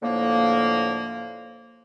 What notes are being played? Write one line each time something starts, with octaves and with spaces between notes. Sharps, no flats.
A2 D3 F3 A#3